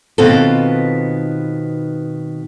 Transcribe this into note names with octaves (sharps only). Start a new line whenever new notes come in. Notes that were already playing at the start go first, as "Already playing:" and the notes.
B2 D#3 B3 C4 F4 A4